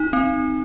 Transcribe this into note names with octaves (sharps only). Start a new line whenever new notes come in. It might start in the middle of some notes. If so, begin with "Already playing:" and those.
Already playing: D#4
C4